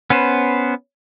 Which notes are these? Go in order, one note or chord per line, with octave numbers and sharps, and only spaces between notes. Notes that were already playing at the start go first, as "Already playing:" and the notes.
B3 C#4 B4 C5